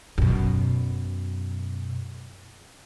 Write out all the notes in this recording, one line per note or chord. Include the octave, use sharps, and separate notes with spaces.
F#2 B2